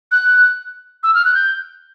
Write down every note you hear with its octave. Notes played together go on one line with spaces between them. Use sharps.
F#6
E6
F6
F#6
G6